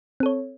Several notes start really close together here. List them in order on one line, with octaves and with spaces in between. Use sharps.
C4 A4 C#5